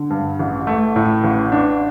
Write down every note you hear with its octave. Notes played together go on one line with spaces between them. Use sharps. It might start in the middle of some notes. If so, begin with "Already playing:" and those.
Already playing: D3
G2
A1
A3
A2
A1
D4